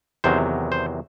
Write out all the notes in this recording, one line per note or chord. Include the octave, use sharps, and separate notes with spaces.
E2 C3 D#3 F#3 C5
C5